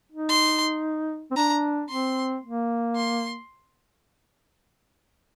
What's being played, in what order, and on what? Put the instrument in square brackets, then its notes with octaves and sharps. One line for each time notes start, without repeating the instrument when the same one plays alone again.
[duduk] D#4
[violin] C6
[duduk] C4
[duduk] D4 [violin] A#5
[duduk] C4 [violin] C6
[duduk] A#3
[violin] C6